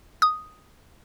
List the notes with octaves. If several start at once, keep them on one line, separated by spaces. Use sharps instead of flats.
D#6